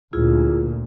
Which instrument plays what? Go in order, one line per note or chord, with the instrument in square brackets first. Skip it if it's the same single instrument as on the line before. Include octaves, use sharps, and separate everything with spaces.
[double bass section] D2 A#2 [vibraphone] E4 F4 G#4